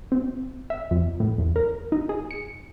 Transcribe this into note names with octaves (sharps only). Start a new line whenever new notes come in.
C4
E5
F2
A2
E2
A#4
D#4
G#4
C#7